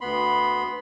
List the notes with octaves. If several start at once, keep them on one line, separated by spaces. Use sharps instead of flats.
D2 B3 B5 C6